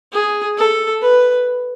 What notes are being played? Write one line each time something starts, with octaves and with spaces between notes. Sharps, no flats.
G#4
A4
B4